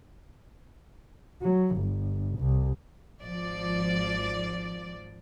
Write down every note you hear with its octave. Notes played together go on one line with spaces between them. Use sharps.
F#3
G1
C2
G#1 F3 D5